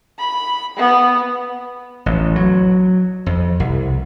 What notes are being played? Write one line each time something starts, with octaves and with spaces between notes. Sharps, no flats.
B5
B3
A1
F#3
F2
C2